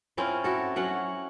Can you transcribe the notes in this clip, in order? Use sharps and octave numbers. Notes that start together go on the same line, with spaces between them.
C4 C#4 E4 F4
E4 F#4 A4
F#3 C#4 F#5